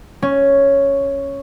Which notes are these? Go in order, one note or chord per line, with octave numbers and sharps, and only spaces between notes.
C#4